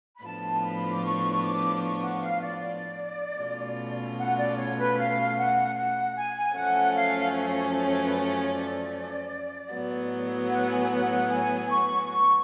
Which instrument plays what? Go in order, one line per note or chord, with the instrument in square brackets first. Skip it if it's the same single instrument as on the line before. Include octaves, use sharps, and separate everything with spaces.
[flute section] B5
[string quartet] A2 F3 B3 D4 F4 [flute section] A5
[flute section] B5
D6
C#6
D6
C#6
F#5
F5
D5
D5
[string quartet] B2 A3 C#4 F4
[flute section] F#5
D5
C#5
B4
F5
F#5
F#5
G#5
[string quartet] F#2 F3 A3 C#4 [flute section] F#5
[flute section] F5
C#5
C#5
B4
C#5
D5
[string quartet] A2 F#3 B3
[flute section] F#5
G#5
G#5
F#5
F#5
G#5
C#6
C#6